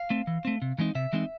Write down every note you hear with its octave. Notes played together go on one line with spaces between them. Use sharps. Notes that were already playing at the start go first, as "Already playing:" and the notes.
Already playing: F5
A3 C4
E3
A3 C4
C3
E3 G#3 C4 D#4
C3 E5
E3 G#3 C4 D#4